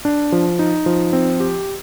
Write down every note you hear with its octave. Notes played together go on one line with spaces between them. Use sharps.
D4
F3
D#4
F3
C4
G4